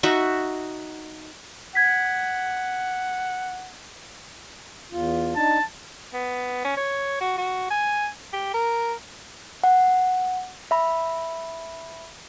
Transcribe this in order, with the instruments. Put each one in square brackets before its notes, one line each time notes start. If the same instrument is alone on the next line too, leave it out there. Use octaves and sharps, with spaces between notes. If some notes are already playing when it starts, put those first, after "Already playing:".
[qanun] D#4 F#4 E5
[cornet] F#5 [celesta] G#6 B6
[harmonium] E2 F4
[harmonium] D4 D#4 [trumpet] A5
[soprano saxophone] B3
C#4
C#5
F#4
F#4
G#5
G4
A#4
[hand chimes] F#5
E5 B5